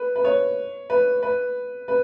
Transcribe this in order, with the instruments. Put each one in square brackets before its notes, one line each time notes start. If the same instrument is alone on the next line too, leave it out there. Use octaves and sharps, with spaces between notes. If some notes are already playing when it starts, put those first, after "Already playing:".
Already playing: [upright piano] B4
B4
C#5
B4
B4
B4